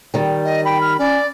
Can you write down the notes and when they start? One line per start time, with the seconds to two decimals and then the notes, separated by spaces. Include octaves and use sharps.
0.14 D#3 G3
0.45 D#5
0.65 G5 B5
0.81 F6
0.99 C#4 D5